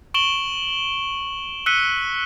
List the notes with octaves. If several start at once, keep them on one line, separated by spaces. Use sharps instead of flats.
C#6 D7 E7 F#7 G7
E6 F#6 B6 C#7 D#7 G7